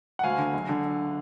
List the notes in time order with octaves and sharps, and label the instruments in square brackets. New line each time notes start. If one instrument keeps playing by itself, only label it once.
[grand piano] F#5
D2 F5 G#5
D3
F#1
D3